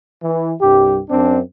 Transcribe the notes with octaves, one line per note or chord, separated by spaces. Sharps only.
E3
C2 G2 G4
F#2 C4 D4